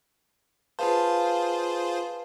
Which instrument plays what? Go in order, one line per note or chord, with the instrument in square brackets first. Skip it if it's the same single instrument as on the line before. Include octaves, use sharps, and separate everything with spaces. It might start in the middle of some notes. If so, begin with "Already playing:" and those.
[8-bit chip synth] F4 G#4 C5 [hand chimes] B4 F5 A5